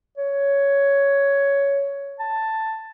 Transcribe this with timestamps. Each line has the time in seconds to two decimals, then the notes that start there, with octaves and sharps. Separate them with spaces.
0.18 C#5
2.20 A5